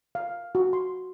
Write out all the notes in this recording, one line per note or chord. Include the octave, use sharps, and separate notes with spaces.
F5
F#4
C6